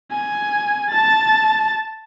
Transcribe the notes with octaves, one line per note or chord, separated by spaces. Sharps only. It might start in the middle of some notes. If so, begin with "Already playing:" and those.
G#5
A5 A6